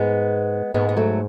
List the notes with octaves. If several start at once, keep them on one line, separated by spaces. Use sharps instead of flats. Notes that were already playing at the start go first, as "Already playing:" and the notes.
Already playing: G#2 G#3 B3
G#2 G#3 B3
B3
F#3 A3